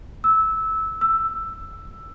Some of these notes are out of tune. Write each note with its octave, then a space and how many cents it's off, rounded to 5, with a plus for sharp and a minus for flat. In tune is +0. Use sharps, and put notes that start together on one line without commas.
E6 -15
E6 +10